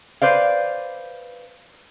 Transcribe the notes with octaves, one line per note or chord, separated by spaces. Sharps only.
B4 C5 D5 F5